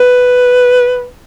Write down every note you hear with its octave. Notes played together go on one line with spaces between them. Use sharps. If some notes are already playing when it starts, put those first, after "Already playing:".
Already playing: B4